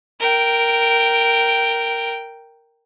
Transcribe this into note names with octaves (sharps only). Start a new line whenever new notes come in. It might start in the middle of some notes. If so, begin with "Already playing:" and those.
A#4 G5